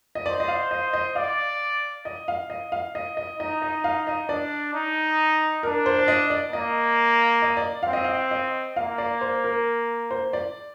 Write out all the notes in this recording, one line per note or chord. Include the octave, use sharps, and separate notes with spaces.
D#5
C5 D5
D#5
F5
D#5
D#5
D5 F5
D#5
F5
D#5
F5
D#5
D#5
D#4 D#5
D#5
F5
D#5
D4 D5
D#4
D4 A#4
C5
D5
D#5
D5
A#3 D#5
D#5
D5
C4 F5
D#5
F5
D#5
A#3 F5
D5
C5
A#4
C5
D5